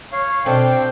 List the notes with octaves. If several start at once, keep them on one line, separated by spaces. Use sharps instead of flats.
C#5 F5
B2 C4 D4 A4 F5 G5